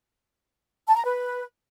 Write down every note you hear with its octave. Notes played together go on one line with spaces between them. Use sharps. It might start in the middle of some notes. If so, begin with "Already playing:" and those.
A5
A#5
B4